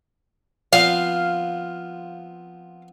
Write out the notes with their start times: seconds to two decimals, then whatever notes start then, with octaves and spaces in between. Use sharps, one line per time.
0.73 F3 B3 C4 F5